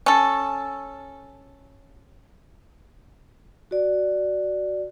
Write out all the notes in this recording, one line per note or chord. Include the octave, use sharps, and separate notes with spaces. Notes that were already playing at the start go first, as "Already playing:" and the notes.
C#4 A4
F#4 D5